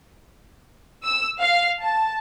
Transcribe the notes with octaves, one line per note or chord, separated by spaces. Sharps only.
E6
F5
A5